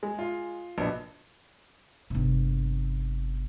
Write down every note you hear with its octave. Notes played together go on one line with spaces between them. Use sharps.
G#3
F4
A#1 B2 B4 D#5
G1 C3